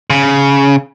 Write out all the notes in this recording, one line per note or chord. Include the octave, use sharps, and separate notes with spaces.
C#3